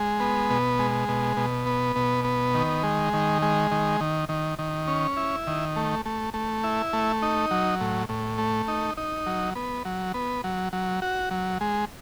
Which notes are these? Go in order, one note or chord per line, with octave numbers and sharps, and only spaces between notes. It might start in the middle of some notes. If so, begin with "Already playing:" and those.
Already playing: G#3
B3
B2
G#3
B2
B2
B3
B2
B3
D#3
G#3
D#3
G#3
D#3
D#3
D#3
D#3
C#4
E4
D#3
A3
A3
A3
E4
A3
D#4
F#3
A2
A2
A3
D#4
D#4
F#3
B3
F#3
B3
F#3
F#3
F#4
F#3
G#3